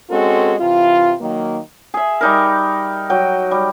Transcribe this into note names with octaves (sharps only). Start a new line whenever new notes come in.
G#3 C4 C#4 F#4 A4
C3 E3 F4
D#3 F#3 A#3
G#4 E5
G3 D#4 A#4
F#3 G5
G3